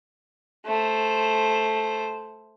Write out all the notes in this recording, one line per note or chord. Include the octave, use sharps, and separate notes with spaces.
A3 C5